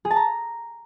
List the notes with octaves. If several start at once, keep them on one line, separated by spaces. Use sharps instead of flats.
G#4
A5
A#5